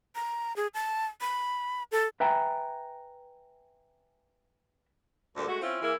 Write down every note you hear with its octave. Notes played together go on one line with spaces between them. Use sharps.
A#5
G#4
A5
B5
A4
B4 E5 G5 G#5 A#5
D2 A#2 G3 A4
G#3 A3 F#4
C4 C#4 E4 F4
E3 A#3 E4 G#4 A#4